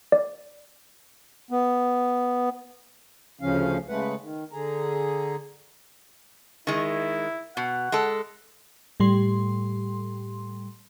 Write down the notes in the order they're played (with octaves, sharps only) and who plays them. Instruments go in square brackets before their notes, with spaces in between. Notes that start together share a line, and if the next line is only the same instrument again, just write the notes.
[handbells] D5
[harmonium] B3
D2 C#3 F3 C#4 F5
C#3 G#3 A3 B4 F#5
D#3
D3 G#4 A#5
[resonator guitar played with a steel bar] D#3 G#3 [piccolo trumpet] E4
[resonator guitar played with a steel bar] B2 [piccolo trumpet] F#5
[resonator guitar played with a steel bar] G#3 A4
[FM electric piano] A2 G3 C6